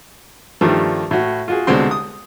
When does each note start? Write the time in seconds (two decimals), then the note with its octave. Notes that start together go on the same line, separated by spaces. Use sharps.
0.61 G2 D#3 F3 G3 A3
1.11 A2 F#4
1.48 F4 F#4 G#4
1.67 C2 B2 D3 G#3 C4 C6
1.91 D#6